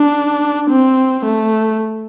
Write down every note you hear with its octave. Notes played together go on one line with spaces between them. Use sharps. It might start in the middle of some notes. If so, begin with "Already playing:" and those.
Already playing: D4
C4
A3